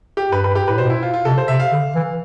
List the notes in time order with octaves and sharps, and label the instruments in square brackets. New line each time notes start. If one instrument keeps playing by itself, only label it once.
[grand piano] G4
[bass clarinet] G2 [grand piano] B4
[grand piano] B4
G4
[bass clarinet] A2 [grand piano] B4
[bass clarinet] B2 [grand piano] C5
[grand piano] E4
F4
F4
[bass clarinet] C3 [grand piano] A4
[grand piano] C5
[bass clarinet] C3 [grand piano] E5
[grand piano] F5
[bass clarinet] D3
E3